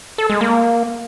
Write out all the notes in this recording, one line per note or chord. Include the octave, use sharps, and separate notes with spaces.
A4
G#3
A#3